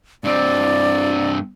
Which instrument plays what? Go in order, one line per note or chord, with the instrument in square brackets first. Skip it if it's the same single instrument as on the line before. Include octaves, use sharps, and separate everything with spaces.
[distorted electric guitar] G2 C4 [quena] D5